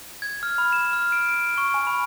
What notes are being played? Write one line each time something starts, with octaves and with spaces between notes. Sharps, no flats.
G#6
F6
B5
E7
F6
D7
D7
C#6
G#5
B5